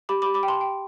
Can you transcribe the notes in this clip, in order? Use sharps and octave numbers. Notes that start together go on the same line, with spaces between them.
G4 B5 D6
B5 D6
G4
B5 D6
G5
A5 C6
G5